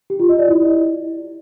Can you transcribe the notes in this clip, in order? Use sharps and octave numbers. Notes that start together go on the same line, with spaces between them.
G4
F4
D#5
D5
E4